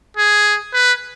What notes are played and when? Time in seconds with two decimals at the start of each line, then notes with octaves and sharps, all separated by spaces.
0.17 G#4
0.74 B4